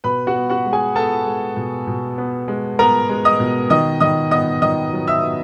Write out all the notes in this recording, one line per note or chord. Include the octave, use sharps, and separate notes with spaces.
B2 B4 B5
F#4 F#5
B3
F#4 F#5
G#3
G#4 G#5
B3 A4 A5
G#3
B2
B2
B3
G#3
B3 A#4 A#5
G#3
D#5 D#6
B2
D#3 D#5 D#6
D#3 D#5 D#6
B3 D#5 D#6
D#3 D#5 D#6
F#3
E5 E6
B3